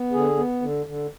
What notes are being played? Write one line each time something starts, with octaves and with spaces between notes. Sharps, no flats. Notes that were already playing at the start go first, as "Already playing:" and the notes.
Already playing: B3
D3 G#4
B3
D3
D3